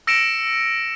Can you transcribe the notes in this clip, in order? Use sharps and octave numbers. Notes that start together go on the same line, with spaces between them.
E6 A#6 C#7 D7 E7